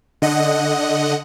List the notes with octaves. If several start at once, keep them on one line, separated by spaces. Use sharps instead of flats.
D3 D#5 F#5